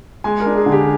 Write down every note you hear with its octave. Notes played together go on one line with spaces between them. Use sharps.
G#3 G#5
A#4
D4
G#4
D3
G4